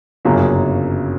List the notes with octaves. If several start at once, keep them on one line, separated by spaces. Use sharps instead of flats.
G1 F#2 C#3 F#3 A#3